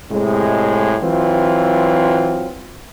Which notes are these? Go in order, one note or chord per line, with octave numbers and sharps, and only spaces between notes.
A2 C3 G#3
E3 F#3 C4 F4